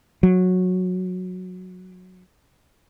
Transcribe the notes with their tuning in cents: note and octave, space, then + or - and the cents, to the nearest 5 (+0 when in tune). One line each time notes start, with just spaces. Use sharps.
F#3 -15